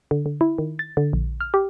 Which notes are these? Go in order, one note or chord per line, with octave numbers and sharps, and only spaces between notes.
D3
D3
E4
D#3
A6
D3
A#1
F6
G4